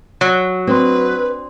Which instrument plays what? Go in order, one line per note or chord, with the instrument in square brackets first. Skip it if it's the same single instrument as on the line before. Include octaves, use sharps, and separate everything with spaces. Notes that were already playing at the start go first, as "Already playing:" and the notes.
[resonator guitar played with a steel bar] F#3 [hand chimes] F#5
[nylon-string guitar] C4 [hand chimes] D4 C6 [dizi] B4